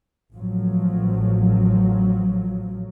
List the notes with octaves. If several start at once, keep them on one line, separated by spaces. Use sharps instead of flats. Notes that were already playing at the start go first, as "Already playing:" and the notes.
A1 F3 F#3